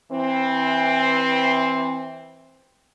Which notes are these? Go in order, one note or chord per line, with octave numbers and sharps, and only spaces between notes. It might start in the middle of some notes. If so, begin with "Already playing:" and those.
E3 C4